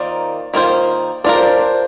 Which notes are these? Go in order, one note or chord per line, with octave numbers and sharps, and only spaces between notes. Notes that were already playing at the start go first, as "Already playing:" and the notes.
Already playing: D#3 A#3 F4 C5 D5
D#3 A#3 F4 C5
D4 F4 A#4 D5
C5
D5
C5